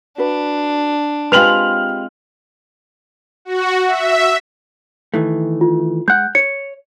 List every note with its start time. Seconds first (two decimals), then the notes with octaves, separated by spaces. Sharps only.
0.18 D4 F#4 B4
1.32 G#3 C4 F4 G4 B4 F6 F7 F#7
3.45 F#4
3.87 E5
5.14 D#3 E3 A3
5.61 F4
6.08 G#3 F#5 F#6 G6
6.35 C#5 C#7